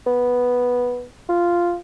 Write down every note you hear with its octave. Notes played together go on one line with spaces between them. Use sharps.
B3
F4